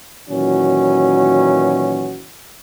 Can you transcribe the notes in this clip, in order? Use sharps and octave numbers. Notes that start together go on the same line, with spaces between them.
A#2 D#3 E3 F#3 C#4 F#4